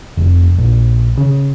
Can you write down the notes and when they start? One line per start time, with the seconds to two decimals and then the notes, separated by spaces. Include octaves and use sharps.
0.17 F1
0.58 A#1
1.18 C#3